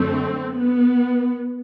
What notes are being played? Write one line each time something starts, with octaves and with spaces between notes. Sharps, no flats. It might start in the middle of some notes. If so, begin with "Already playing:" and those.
Already playing: F#2 D3 F#3 A3 C4
B3